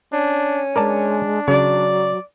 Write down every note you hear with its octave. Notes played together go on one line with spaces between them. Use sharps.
C#4 D4
G#3 D4 A#4 D5 A5
C#3 F#3 D5